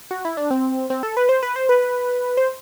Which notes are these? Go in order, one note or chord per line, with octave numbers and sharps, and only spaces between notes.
F#4
E4
D4
C4
C4
A4
B4
C5
B4
C5
B4
C5